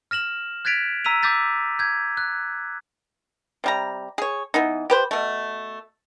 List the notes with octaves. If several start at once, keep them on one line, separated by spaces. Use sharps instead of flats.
F6 A#6 E7 F#7
F#6 G#6 A6 B6 D7 F7
A#5 E6 B6 D#7 F7
D6 E6 G6 A6 B6
G6 G#6
F#6
C3 G3 A#5
G#4 C#5
E3 B3 D#4
G4 B4 C5
B2 A3